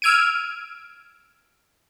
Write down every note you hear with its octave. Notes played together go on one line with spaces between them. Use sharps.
E6 F6 G#6 D7 D#7